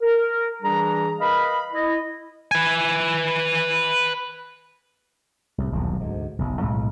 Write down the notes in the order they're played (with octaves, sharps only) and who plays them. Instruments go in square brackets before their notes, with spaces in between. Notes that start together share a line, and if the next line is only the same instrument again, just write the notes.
[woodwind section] A#4
E3 G3 D4 G#4 A#5
A#4 B4 D#5 F5 B5
E4 D#5
[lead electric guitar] B4 G#5
[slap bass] C2 A2
D#1 B1 E2
D2 G#2
F#1 B1
B1 F2 A2 G#3